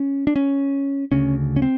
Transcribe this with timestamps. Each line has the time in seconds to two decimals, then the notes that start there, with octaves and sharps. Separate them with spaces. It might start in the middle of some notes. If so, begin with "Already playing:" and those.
Already playing: C#4
0.27 D4
0.36 C#4
1.12 D2 C#3 C#4
1.56 C#4
1.62 C4